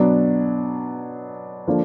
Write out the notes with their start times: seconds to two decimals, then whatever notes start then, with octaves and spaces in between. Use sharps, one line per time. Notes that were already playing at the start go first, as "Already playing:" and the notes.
Already playing: B2 F#3 B3 D4
1.67 D3 F3 A#3 D4